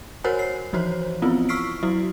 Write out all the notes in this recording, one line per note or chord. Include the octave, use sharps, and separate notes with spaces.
F#4 A#4 C5 C#5 F#5 G#5
C7
E3 F3 F#4 C5 C#5
B3 C4 E4 F4
C#6 E6 F6 B6 C7 D7
F#3 E4 F#4